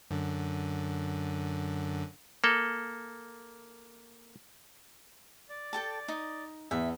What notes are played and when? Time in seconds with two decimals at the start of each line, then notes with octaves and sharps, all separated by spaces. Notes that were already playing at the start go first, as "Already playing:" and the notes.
0.11 F#2 D3
2.44 A#3 A4
5.49 D5
5.73 A4 G5 A5
6.08 D#4 D#6
6.71 E2 E5